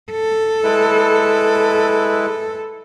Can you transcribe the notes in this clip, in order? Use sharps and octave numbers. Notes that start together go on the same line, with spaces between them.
A4
G#3 E4 B4